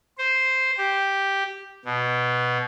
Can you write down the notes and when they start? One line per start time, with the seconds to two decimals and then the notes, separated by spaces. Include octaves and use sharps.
0.18 C5
0.77 G4
1.85 B2